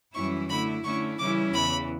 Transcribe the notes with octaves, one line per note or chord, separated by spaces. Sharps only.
F#2 E3 G3 C#4 E4 C#6
D3 A3 E4 B5
D3 A3 C#4 E4 C#6
C#3 E3 G3 C#4 E4 D6
E2 C#3 E3 B5